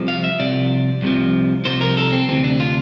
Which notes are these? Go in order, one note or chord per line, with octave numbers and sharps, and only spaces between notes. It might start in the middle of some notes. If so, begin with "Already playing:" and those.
Already playing: C2 C3 F3
F5
E5
C2 C3 F3 D5
C2 C3 F3
C2 C3 F3 C5
A#4
A4
C4
D2 C3 E3 C4
D4
F4